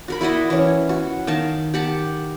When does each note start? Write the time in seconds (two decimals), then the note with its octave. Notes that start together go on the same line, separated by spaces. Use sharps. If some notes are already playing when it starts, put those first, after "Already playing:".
0.08 F#4 A#4 B5
0.21 E4 F#4 D5 D#5
0.50 E3 C#4
0.89 F#4
1.27 D#3 F5 A5
1.74 G4 F#5 A5